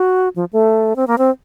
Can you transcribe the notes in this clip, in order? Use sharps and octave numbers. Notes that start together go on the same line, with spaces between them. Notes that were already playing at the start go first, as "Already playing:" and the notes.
Already playing: F#4
F3
A3
C4
A#3
C4